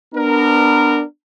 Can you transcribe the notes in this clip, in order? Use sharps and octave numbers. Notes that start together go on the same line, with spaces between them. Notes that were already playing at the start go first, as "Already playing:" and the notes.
B3 D4 A#4